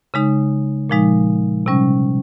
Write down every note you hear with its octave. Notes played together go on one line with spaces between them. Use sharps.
C#3 G#3 D#4
A#2 F3 G#3 D#4
C3 G3 C#4